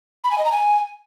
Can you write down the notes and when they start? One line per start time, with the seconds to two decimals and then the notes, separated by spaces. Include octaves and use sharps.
0.24 B5
0.31 G#5
0.38 D#5
0.45 A#5
0.52 G#5